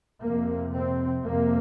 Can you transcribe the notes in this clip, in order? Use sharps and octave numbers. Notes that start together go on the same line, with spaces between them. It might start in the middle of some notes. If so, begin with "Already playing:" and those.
F2 C3 A#3
C4
F2 C3 A#3